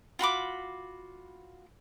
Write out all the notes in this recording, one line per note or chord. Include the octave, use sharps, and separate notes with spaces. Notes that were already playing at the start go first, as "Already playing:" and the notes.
F4 F#4 B5 D6